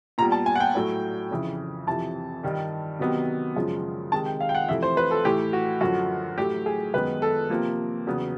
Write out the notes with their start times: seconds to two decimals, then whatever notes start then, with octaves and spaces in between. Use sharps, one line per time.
0.18 A#2 G3 B3 A#5
0.32 A5
0.46 G#5
0.55 F#5
0.60 G5
0.75 A2 F#3 A3
1.31 F2 C#3 E3
1.87 F2 C3 E3 A5
2.43 G2 D#3 G3
2.99 C3 D#3 F#3 B3
3.56 F#2 C#3 F3 G#3
4.12 C3 D#3 G#3 A5
4.26 G5
4.40 F5
4.49 G5
4.55 F#5
4.68 F2 C3 E3 A3 E5
4.83 C5
4.97 B4
5.11 A4
5.25 A2 E3 A3 G4
5.53 F#4
5.81 F#2 D3 F3 F#4
6.38 A2 F#3 A3 G4
6.66 G#4
6.94 F#2 D#3 G#3 B3 B4
7.22 A4
7.50 C3 F3 A#3
8.06 E2 C#3 F#3 B3